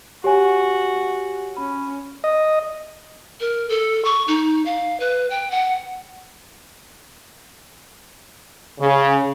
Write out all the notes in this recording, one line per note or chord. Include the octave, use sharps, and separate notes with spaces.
F#4 G4 C#5 G#5
C#4 B5
D#5
A#4
A4
C#6
D#4
F5
B4
G5
F#5
C#3